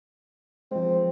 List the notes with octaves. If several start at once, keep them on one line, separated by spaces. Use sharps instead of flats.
F3 G#3 C4